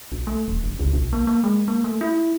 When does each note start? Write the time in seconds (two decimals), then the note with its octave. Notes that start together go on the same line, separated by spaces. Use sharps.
0.12 B1
0.27 A3
0.48 D#1
0.64 F#1
0.79 C#2
0.93 B1
1.13 A#3
1.27 A#3
1.44 G#3
1.68 A#3
1.84 A3
2.01 E4